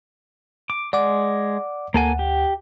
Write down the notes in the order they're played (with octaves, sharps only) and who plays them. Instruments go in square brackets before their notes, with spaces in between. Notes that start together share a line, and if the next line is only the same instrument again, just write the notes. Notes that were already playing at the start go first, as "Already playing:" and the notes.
[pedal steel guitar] D6
[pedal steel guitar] G#3 [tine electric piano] D5 F#5 D6
[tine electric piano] D2 F#5 [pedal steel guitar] A#3 A4 G#5
[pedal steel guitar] G4